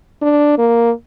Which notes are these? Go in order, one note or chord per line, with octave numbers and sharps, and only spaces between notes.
D4
A#3